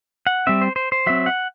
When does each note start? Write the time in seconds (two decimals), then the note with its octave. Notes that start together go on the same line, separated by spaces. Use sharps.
0.27 F#5
0.47 G3 C4 E5
0.62 C5
0.76 C5
0.92 C5
1.06 F#3 C4 E5
1.26 F#5